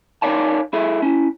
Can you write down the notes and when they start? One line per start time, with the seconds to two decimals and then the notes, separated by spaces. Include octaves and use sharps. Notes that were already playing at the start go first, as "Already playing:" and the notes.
0.22 D#4 A#4 C#5 D5 F5 A5
0.73 E4 G#4 A4 E5
1.02 C#4 E4